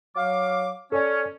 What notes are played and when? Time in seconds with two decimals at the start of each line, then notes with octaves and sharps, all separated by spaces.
0.16 F#3 F5 D6
0.92 C#4 A4 D5